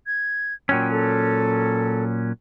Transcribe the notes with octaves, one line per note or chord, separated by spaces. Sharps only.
G#6
A#2 F#3 C#4 G5
A4